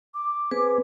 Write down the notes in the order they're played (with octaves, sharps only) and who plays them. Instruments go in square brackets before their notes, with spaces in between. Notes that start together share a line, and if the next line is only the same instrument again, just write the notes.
[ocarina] D6
[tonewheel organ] B3 C4 G#4 [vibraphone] B4